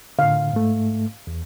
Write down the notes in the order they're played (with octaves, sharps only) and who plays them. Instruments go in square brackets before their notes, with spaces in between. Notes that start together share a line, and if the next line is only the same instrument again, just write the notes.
[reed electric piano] A2 D3 [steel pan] F5
[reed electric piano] G#2 A3
E2